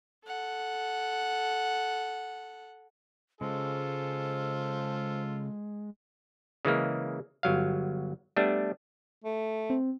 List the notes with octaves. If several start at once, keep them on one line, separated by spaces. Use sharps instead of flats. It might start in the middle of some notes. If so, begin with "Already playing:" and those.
A4 F#5
C#3 G#3 F4 A4 C5
C#3 E3 G#3 A#3
G1 F#3 F5
G3 A3 B3 D4
A3
C4